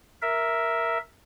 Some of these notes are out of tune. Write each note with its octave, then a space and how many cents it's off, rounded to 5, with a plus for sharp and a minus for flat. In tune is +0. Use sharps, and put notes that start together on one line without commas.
A#4 +0 E5 +0